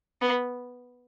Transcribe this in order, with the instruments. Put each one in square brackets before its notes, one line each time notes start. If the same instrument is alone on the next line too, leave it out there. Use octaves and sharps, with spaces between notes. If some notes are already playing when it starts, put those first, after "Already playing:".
[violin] B3